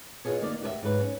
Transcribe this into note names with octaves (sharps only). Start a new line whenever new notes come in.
E2 B2 E3 F4 G#4 C#5
D#3 A#3 D5
F#4 G4 C#5 E5
G#2 F#3 B4
C#4